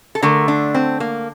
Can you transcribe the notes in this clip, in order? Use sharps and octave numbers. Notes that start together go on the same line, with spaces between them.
A4
D3 A3 A#4
D4
C4
A#3